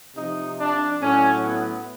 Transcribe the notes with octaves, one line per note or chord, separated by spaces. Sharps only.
C3 F3 D#4
D4
A2 F#3 C#4
B3